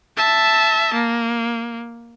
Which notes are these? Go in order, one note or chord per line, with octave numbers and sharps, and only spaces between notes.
E5 A5
A#3